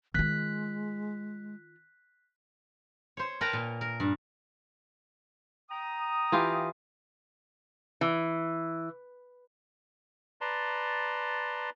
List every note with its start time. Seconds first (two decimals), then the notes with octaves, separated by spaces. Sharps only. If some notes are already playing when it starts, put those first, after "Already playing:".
0.14 D#3 G#3 F4 F#6 B6
3.17 C5 C#5
3.41 A#4 B4 G5 A5 A#5
3.53 A#2
3.81 A#4
4.00 G2
5.70 G5 A#5 D#6
6.32 E3 F4 G4
8.01 E3
10.41 B4 D5 A5 A#5 C6